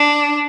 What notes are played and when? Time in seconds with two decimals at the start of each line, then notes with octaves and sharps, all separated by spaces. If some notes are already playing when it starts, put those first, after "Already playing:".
Already playing: D4